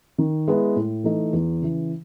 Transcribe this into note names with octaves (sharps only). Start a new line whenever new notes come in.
D#3
G#3 B3 E4
A2
E3 A3 D#4
E2
C#3 E3